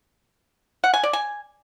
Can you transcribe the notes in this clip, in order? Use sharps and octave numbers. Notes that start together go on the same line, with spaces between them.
F#5
G#5
D5
G#5